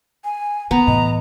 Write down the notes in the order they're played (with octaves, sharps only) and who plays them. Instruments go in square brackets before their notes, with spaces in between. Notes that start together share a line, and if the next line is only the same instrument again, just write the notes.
[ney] G#5
[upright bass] D#3 [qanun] B3 [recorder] A#5
[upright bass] A2 E3 [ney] D#5